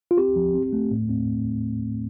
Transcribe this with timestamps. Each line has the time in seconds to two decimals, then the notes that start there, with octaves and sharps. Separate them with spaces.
0.11 F4
0.18 C4 G4
0.36 F3
0.54 C4
0.73 A3
0.91 A2
1.09 C4